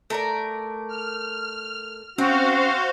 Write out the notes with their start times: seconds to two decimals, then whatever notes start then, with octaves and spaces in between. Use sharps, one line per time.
0.10 A3 A#4 D5
0.88 F6
2.18 C4 C#4 F#4 C5 F5